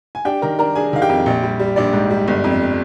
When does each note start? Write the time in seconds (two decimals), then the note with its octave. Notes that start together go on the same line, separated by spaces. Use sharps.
0.15 G#5
0.25 D4 G4 G5
0.42 D#3 A#4 A#5
0.59 D4 A#4 A#5
0.75 D4 G#4 G#5
0.93 D#3 F5
1.02 G4 G5
1.09 F2
1.26 A#1
1.43 G3
1.59 G3
1.76 A#1 D4 D5
1.93 G#2
2.10 G3
2.28 G1
2.44 F2